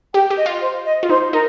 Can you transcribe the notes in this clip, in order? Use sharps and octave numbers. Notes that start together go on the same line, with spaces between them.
G4 G5
G4
D#5
F4
C5
D#5
F4
D#4 C5
D#4 A#4